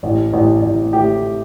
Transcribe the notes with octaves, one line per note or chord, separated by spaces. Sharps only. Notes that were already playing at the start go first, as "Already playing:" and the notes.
A1
A1
A1
A2 G4